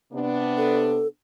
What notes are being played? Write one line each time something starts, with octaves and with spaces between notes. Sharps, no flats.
C3 B3 D4
A4